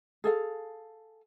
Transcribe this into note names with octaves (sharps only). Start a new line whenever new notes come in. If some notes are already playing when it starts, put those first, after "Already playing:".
G#4 A4 F5